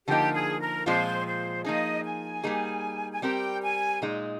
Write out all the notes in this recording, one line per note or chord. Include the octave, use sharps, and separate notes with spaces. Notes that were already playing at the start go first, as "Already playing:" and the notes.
D3 F3 A#3 D#4 G4
G#4
A#4
A#2 F3 G#3 C4 F4 C5
C5
F3 A#3 D#4 G#4 D#5
G#5
G3 A#3 D#4 G#4
G#5
G3 C4 G4 A#4 G5
G#5
A#2 G#3 D#4